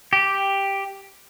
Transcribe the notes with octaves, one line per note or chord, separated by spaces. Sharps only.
G4